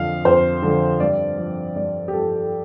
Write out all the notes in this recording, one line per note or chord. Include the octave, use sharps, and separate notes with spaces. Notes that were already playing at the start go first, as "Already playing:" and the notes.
Already playing: F2 D3 F3 F5
F2 C5
D3 F3
G2 D5
F3
G2 D5
G4
F3 A4